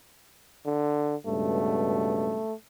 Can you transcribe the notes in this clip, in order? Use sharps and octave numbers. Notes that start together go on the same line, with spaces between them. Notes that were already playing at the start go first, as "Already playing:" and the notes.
D3
C#2 G2 B2 A3